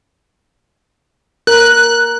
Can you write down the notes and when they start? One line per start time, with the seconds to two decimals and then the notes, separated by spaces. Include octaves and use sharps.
1.47 A#4 F#6